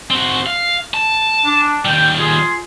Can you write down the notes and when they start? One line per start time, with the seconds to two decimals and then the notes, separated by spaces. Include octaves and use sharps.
0.11 C4 F#4
0.46 F5
0.94 A5
1.45 D4
1.85 D#2 G3 G5
2.18 F4 G#4